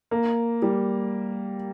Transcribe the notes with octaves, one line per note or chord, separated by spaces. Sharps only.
A#3
G3